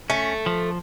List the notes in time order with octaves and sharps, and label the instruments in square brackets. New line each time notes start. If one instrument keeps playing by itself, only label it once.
[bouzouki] A3 [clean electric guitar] C#4
[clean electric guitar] F3